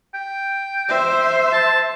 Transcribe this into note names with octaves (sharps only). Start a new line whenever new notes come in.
G5
C5 E5
A5